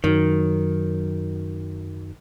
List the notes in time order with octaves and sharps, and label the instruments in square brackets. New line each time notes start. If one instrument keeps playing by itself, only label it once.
[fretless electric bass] F#2 F#3 [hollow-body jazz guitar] D#3